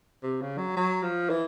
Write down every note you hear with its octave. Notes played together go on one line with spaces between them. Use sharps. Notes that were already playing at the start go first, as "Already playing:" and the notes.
C3
C#3
F#3
F#3
F3
E3